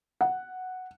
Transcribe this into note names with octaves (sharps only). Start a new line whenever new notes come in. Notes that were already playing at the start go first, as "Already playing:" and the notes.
F#5